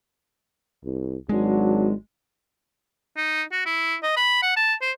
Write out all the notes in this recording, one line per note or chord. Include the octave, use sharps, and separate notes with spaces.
C2
G#1 F#3 G#3 D4 F#4
D#4
F#4
E4
D#5
B5
F#5
A5
C5